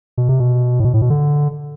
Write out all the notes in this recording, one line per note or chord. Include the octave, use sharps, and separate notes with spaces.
B2
C3
B2
A2
B2
A2
B2
D3